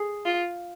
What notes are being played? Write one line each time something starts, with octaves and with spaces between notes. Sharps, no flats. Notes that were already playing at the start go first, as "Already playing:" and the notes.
Already playing: G#4
F4